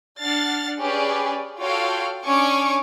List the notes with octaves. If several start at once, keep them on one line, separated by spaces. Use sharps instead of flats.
D4 F#5 F6 A6 C7
C#4 G4 G#4 B4 D5
F4 F#4 A4 C#5 F5 G5
C#4 D4 G#5 C#6 D6 C#7